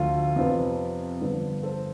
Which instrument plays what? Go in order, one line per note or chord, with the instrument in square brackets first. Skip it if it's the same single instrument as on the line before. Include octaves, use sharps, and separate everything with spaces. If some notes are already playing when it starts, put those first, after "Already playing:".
Already playing: [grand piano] D2 D3 F3 A3 F4
F2 C3 F3 B3
G2 D3 F3 B3
A4 C5